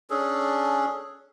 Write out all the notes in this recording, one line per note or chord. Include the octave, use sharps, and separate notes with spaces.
C#4 D4 G#4 A4